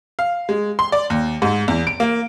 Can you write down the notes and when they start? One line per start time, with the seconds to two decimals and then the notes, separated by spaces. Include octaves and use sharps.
0.19 F5
0.49 G#3
0.79 C6
0.92 D5
1.10 D#2
1.42 G#2
1.68 E2
1.87 D7
2.00 A#3